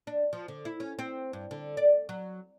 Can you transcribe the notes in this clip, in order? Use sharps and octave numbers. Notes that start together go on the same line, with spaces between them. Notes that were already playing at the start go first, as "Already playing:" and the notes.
D4
F3
D3
E4
C#4
C4
G2
D3
D5
F#3